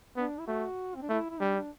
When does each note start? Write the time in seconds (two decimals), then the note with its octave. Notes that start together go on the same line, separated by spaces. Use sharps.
0.16 B3 D4
0.39 E4
0.47 A3 F#4
0.95 C4
1.02 D4
1.09 A3 E4
1.30 E4
1.40 G3 D4
1.56 D4